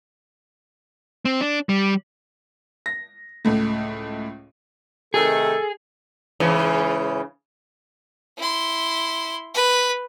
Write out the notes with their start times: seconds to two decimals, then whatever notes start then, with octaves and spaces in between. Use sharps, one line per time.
1.25 C4
1.41 D4
1.69 G3
2.86 A#6
3.45 C#2 A2 A3
5.14 C3 D#3 A3 G#4 A4
6.40 G#2 C#3 E3
8.38 E4 C6
9.54 B4